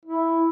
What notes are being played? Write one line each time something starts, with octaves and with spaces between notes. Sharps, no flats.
E4